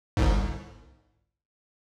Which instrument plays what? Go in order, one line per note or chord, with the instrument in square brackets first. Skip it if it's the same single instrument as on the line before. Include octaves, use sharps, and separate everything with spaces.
[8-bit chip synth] G1 C2 G#2